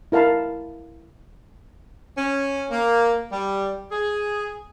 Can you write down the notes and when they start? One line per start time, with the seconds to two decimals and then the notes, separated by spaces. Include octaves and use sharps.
0.12 E4 A#4 F5 A5 B5
2.18 C#4
2.70 A#3
3.32 G3
3.92 G#4